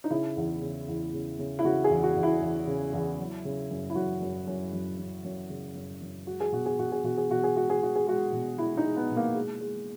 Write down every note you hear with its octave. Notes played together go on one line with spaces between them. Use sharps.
D#4
C#3 E4
E2
C#3
E2
C#3
C#3
E4
C#3 F#4
G#4
E2
F#4
E2
E4
E2
C#3
E2
F#3
C#3
F#2
E4
F#2 F#4
F#2
F#2
F#2
F#2
F#2
C#3
F#2
F#2
G#3 F#4
G#4
B2 F#4
G#4
B2 F#4
G#4
B2 F#4
G#4
B2 F#4
G#4
G#3 F#4
G#4
G#3 F#4
G#4
G#3 F#4
B2
G#3 E4
D#4
G#3
B3
B2
A#3
G#3
G#3